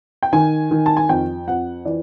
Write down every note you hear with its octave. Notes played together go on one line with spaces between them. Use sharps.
G5
D#3 G#5
D#3
A5
G#5
F2 G5
F2 F#5
E3 D5